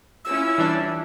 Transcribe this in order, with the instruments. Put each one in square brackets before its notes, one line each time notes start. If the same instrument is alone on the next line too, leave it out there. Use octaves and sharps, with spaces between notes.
[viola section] C#4 E4 F4 [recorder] E6
[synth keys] E3 G3 D4